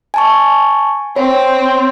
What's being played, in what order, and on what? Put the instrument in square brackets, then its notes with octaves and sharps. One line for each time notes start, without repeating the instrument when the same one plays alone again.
[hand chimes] G#5 A5 C#6
[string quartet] C4 [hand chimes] C#5